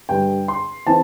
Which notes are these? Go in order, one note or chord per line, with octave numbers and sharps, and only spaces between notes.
G2 D3 G3 G5
C6
E3 C4 A5